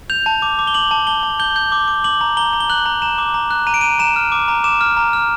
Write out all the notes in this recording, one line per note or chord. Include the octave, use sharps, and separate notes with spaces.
G6 F7
A5
D6
D6
G7
D6 F#7
A5
A5 G7
A5
G6 G7
G6
D6
D6
D6 F#7
A#5
A#5 G7
A#5
G7
F#6 F#7
A#5
A#5 E7
D6
A#5
F#6
A#5 D#7
D7
A#5 D#7
A#5 E7
F6
D6
A#5
D6 E7
F6
A#5
F6